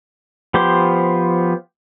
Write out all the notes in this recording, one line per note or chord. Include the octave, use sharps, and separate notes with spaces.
F3 B3 G4 C5 C6